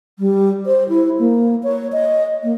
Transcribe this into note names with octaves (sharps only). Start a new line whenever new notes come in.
G3
C5
E4
A#3
C#5
D#5
A#3